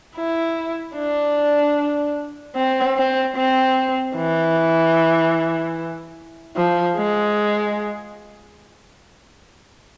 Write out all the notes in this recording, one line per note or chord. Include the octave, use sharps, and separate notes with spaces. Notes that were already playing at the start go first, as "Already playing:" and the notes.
E4
D4
C4
C4
C4
E3
F3
G#3